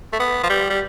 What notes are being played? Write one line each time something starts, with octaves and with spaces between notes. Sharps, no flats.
A3
B3
F3
G3
G3